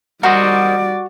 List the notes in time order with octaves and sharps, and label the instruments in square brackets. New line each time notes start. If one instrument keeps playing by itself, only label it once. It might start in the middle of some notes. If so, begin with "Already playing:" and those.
[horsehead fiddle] G3 D5 [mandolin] F#4 [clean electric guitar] A#4 C5 D#5